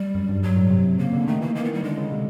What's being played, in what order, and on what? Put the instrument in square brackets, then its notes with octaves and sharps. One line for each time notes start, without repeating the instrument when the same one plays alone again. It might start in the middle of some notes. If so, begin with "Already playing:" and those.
Already playing: [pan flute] G3
[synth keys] F#2
G2
[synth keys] G2 [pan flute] F#3
[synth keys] A2
C3
[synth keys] C#3 [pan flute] A#3
[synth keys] D3
[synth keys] D#3 [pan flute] A3
[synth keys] E3 [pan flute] A#3
[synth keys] D#3 [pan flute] A#3
[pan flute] B3
[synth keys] D#3 [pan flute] G3
[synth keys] D3 [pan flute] G#3
[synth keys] C#3
C3